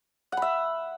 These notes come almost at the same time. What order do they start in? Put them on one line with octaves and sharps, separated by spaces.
F#5 B5 E5